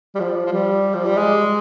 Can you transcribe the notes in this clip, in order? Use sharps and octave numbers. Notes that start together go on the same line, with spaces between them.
G3
F3
F3
G3
F3
G3
G#3